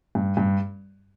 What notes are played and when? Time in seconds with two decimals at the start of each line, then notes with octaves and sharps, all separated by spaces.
0.15 G2
0.37 G2